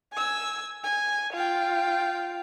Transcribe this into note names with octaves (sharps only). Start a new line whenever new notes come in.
G#5 E6
G#5
F4 G5